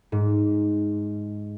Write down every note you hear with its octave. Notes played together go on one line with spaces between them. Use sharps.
G#2